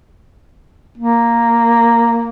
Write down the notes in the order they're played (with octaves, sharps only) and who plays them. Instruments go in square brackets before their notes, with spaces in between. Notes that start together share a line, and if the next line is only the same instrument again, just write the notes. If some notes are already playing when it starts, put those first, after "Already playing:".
[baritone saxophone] A#3